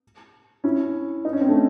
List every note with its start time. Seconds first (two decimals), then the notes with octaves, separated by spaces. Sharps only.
0.64 C#4 E4
1.25 D#4
1.33 C#4
1.41 C4
1.49 A3 C#4